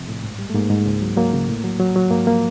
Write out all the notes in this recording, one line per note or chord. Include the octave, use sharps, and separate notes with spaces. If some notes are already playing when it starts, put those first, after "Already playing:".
Already playing: C3 F3 C4
A2
G#2
G3
A3
G#2 A#3
G#2
C#2
F#3
F#3 A#3
C#3
A2
F#3
F#3
F#3
G#2 A#3
F3 A#3